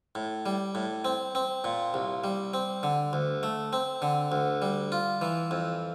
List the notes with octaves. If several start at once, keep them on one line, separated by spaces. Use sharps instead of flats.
A2
G3
A2
C4
C4
A#2
C2
G3
C4
D3
D2
A3
C4
D3
D2
G3
F4
E3
F2